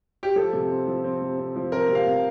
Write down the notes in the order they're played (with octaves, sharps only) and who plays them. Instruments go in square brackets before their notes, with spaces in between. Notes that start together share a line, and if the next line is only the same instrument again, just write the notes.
[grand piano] G4
F3 A4
C3
C4
F3
C4
C3
C4
F3
C4 A#4
C3
F5
C3